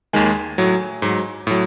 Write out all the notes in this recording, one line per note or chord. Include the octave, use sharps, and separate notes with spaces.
D#2 D#3 G#3 G#5
A2 F#3
G#2 F#3
A2 F#3